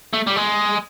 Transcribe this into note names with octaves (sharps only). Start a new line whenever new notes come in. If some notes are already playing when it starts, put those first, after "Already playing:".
A3
G3
G#3